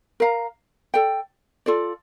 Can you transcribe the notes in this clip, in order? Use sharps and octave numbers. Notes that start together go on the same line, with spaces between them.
A#4 F5 A#5
A4 D5 G5
F4 A4 D5